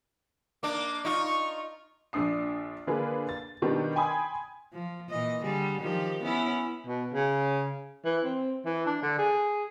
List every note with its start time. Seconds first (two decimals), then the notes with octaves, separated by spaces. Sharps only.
0.63 A#3 D4 D6
1.05 D#4 F4 C#6
1.25 C#6
2.13 A#1 D4 D#6 C7
2.87 D3 A#3 D4 F4 G#4 B4
3.29 A6
3.62 B2 D#3 G3 B3 D4
3.96 G5 G#5 B5 C6 D#6 G#6
4.73 F3
5.09 A#2 E3 D#5
5.43 D3 G3 G#4
5.80 D#3 F3 G4
6.23 B3 C#4 E4
6.86 B2
7.14 C#3
8.05 E3
8.24 C4
8.65 E3
8.86 D4
9.02 D3
9.18 G#4